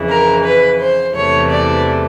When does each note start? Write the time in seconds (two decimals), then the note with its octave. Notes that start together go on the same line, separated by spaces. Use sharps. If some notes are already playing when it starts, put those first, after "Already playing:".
Already playing: F2 C#3 E3
0.09 A#4
0.45 B4
0.80 C5
1.15 E2 C3 E3 A3 C#5
1.50 D5